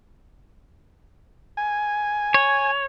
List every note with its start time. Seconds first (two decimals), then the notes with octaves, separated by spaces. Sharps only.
1.57 G#5
2.34 C#5